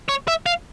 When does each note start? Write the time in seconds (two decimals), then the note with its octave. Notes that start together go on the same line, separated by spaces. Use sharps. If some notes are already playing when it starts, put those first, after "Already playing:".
0.09 C#5
0.28 E5
0.46 F5